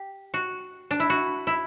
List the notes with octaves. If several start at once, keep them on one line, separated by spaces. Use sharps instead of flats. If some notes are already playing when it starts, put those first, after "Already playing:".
Already playing: G4
F#4
D4
E4
F#4
E4